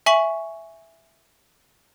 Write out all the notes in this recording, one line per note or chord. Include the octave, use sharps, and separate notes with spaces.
E5 G#5 C#6 B6 F#7